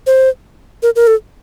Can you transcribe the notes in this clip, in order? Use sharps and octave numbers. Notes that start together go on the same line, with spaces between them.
C5
A#4
A#4
A4